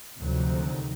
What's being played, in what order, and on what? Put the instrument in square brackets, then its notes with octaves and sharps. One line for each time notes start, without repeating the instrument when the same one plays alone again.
[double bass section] D2 C3 D#3 F3 F#3